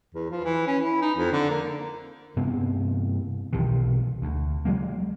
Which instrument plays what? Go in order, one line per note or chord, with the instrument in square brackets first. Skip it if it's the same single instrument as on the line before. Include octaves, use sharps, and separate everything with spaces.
[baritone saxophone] E2
F3
E3
C#4
E4
D#4
F2
D3
A#3
[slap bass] G2 C3 B3 C4
B1 C3 D#3 E3
D2
F#3 G#3 A#3